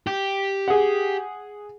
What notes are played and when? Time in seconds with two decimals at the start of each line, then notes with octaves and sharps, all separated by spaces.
0.07 G4
0.68 G#4 F#5